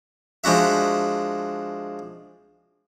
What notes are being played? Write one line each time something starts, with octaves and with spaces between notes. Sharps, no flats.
F3 G#3 D4 F#4 E5